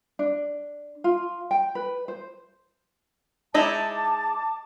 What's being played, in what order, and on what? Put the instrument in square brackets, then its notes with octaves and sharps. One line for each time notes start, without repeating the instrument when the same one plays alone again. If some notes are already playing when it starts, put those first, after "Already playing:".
[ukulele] D4
F4
G5
B4
C5
[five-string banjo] G#3 D#4 E4 [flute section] A5 D6